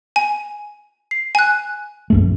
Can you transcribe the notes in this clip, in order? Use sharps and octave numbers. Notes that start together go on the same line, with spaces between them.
G#5
C7
G#5 F#6
A#1 F#2 A3